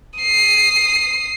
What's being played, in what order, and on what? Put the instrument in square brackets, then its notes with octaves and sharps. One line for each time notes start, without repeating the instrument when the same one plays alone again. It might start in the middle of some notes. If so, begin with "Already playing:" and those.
[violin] D#6 C7